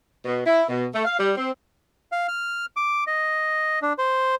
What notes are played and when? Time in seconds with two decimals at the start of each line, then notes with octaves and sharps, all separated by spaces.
0.25 B2
0.46 E4
0.68 B2
0.93 A3
1.05 F5
1.19 G3
1.36 C4
2.12 F5
2.28 F6
2.77 D6
3.07 D#5
3.82 D4
3.98 C5